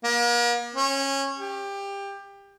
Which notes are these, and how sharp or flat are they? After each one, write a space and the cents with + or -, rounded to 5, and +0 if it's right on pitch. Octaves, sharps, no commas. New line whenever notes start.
A#3 +40
C#4 -20
G4 +20